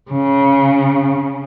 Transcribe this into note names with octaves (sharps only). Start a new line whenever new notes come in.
C#3